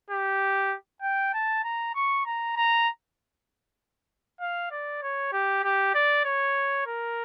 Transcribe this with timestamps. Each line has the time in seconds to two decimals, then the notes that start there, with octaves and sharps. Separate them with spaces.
0.10 G4
1.02 G5
1.34 A5
1.64 A#5
1.95 C#6
2.25 A#5
2.56 A#5
4.41 F5
4.71 D5
5.02 C#5
5.32 G4
5.64 G4
5.94 D5
6.25 C#5
6.86 A#4